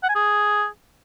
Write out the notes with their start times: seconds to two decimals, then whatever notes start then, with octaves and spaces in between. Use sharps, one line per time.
0.03 F#5
0.09 G#5
0.15 G#4